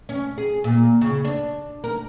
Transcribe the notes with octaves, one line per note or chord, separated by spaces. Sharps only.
C#4
G#4
A#2
C#3
D4
A#4